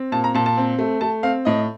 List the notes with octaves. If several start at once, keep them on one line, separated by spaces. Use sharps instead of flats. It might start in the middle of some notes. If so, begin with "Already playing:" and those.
Already playing: C4
A#2 A5
A#5
A#2 A5
A5
C4
A3
A3 A5
C4 F5
A2 D#5